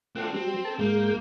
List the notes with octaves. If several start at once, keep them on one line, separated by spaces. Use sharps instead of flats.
A3 C4 D4 F4 F#5
F#3 G3 C4
A4 A5
G#2 G#3 A#3 G6